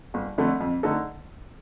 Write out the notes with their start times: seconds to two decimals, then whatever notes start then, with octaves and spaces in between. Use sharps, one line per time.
0.14 G1
0.38 F2 D3 A3
0.60 F2
0.83 D3 A3 D#4 A4